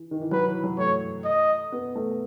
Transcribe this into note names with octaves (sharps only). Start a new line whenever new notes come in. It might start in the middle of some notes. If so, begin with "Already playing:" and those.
Already playing: E3
D#3
E3
F#3 B4
E3
F#3
A3 C#5
D#5
B3
A3